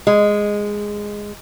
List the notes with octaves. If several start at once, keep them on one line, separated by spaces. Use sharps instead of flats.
G#3